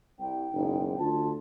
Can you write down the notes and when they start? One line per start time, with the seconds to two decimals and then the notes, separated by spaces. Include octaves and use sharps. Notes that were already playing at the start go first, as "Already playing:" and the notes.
0.19 C2 G5
0.54 F#1 B1 G#2 D#4
0.99 D2 D3 F4 A5